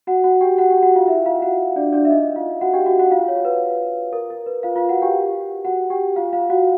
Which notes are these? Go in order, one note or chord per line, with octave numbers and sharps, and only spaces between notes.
F#4 F#5
F#4 F#5
G4 G5
F#4 F#5
G4 G5
F#4 F#5
F4 F5
E4 E5
F4 F5
F#4 F#5
D4 D5
D4 D5
E5
D#4 D#5
F4 F5
F#4 F#5
G4 G5
F#4 F#5
F#4 F#5
F4 F5
C#5
B4
A#4
A#4
B4
F4 F5
F4 F5
F#4 F#5
G4 G5
F#4 F#5
G4 G5
F4 F5
F4 F5
F#4 F#5